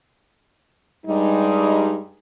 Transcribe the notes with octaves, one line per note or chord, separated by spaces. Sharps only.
G2 G3 G#3 D#4